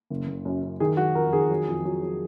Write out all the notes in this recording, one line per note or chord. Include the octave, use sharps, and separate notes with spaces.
F#1
F#1
F#2
F#2
D#3 G#4
F#3 F#4
F2 A#4
D#3 G#4
F#3
F2
F#3
F#3